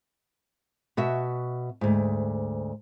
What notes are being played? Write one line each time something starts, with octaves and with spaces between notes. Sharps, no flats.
B2 F#4 E5
D2 G#2